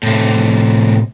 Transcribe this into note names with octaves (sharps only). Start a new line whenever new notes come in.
A2 C3